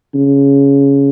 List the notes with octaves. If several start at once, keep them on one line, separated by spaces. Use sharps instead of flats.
C#3